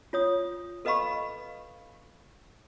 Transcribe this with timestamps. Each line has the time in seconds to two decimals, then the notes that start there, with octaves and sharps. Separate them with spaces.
0.13 F4 C#5 D#6
0.85 A4 B4 D#5 F5 B5 C#6